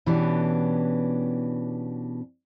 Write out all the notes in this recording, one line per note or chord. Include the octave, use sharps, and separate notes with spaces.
B2 E3 B3 C#4 D4 G4